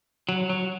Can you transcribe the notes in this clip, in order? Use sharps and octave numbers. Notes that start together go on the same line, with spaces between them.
F#3
F#3